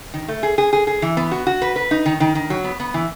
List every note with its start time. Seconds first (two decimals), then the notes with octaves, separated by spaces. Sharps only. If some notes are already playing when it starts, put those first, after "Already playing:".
0.14 D#3
0.28 A3
0.43 G#4
0.58 G#4
0.73 G#4
0.87 G#4
1.02 E3
1.17 B3
1.32 F#4
1.47 F#4
1.62 B4
1.76 B4
1.91 D#4
2.06 D#3
2.20 D#3
2.35 D#3
2.50 F#3
2.64 B3
2.80 B3
2.94 E3